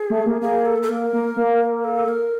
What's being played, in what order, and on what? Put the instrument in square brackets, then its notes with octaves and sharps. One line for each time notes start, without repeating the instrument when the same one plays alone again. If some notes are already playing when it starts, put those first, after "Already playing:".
Already playing: [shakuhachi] G#4
[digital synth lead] A3
A#3
[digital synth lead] A#3 [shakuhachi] G#4
[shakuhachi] A4
A4
[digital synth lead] A#3 [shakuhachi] A#4
[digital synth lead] A#3
A#3
[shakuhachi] A4
A#4